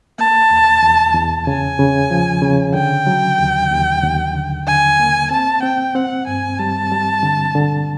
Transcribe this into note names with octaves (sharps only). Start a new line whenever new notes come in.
A#3 A5
E2
E2
E2
C#3 G#5
C#3
F3
C#3
D3 G5
F#3
D#2
D#2
D#2
D3
D3 G#5
A#3
C4 A5
C4 G5
C4 F#5
G2 G#5
G3 A5
G3
D3
D3